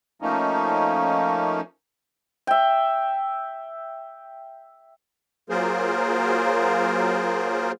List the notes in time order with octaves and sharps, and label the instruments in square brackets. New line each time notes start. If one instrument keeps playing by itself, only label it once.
[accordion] F3 A3 A#3 C#4 D#4
[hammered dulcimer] E5 G5
[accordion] F#3 A#3 F4 G#4 A#4 C5